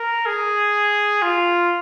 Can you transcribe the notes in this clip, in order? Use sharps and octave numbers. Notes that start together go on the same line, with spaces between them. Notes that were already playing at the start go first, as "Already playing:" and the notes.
Already playing: A#4
G#4
F4